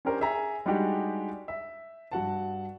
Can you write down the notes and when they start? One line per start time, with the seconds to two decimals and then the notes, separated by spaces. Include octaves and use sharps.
0.05 C#4 D4 G4 A#4 C5
0.21 G#4 E5 G#5 A#5
0.66 G3 G#3 D4 D#4 F#4 G4
1.48 E5
2.12 G2 F#4 F#5 A5